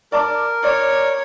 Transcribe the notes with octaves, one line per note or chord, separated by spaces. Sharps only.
A#4 D5 A5 D6
C#5 D5